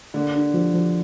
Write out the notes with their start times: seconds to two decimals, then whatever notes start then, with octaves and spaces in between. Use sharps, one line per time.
0.14 D3 A#3
0.34 D4
0.54 F3
0.73 F3